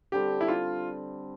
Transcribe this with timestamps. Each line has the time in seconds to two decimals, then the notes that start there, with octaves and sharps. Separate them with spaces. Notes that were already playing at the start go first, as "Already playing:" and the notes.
0.12 D3 G3 C4 G4
0.41 E4
0.48 F4